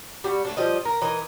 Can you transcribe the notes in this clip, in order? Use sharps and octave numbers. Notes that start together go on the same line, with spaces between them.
G3 F#4
A3 D4
F3 G3 D#5
A#4
E3 A#4 D#5